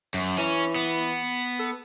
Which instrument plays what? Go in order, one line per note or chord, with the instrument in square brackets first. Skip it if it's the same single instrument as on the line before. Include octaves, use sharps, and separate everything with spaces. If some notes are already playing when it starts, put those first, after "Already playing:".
[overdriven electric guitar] F#2
[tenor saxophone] E3 [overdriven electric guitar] C#4
[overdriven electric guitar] B3
[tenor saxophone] A4